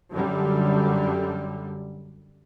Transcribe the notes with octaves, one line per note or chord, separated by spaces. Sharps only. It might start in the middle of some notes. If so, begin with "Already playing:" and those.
F#2 D3 G3